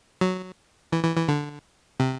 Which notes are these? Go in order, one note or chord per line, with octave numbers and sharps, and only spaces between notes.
F#3
E3
E3
E3
D3
C3